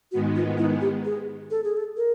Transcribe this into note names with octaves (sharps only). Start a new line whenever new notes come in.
G#2 D#3 G#3 B3 F#4
F4
E4
G4
G#4
A4
G#4
A4
A#4